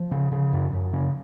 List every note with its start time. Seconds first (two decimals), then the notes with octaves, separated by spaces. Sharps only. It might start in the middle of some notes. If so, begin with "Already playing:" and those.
Already playing: F3
0.11 C#3
0.32 C#3
0.53 F#2
0.73 F#2
0.93 C#3